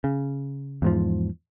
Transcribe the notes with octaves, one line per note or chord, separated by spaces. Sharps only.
C#3
E2 G#2 F3